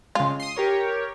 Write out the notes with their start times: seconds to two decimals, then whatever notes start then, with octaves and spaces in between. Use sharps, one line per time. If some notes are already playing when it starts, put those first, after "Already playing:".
0.15 C#3 G#3 F4
0.40 C6 D#6
0.56 G4 A#4 C#5